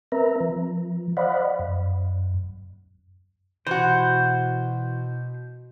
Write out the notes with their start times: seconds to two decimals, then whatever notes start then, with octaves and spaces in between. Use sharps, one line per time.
0.12 C4 A#4 B4 E5 A#5
0.40 F3
1.17 C5 D5 D#5 F5 F#5 B5
1.59 F#2
3.67 B2 E3 F#4 C5